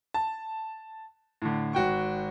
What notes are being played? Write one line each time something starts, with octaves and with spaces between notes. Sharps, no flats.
A5
A2 D3
G#1 F#4 G5 C#6